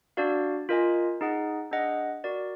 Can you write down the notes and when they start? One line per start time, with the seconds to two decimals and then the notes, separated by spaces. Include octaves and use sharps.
0.17 D4 F#4 D5 F5
0.69 F4 A#4 D#5 G#5
1.21 D#4 G#4 D#5 F#5
1.71 D4 G#4 D#5 F#5
2.24 F#4 A#4 D5